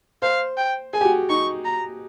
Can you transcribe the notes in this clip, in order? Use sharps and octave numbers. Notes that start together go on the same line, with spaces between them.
C5 F5
G5
G#4 G#5
G4
F#4
D#4 C#6
A#5